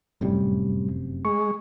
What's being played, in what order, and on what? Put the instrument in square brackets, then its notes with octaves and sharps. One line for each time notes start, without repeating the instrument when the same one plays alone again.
[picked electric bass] F1 F#2 C3 [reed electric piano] A2 G3
[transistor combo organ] G#3 [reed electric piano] C#6